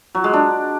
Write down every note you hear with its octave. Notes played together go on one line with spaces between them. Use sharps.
F#3
G#3
D4